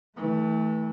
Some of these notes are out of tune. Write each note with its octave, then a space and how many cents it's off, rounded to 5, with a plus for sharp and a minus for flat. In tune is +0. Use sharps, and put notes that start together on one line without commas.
E3 -30 A3 +0